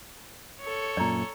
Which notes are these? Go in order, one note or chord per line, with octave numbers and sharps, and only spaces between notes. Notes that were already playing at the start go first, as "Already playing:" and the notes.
A4 C#5
F#2 A#2 D5 A#5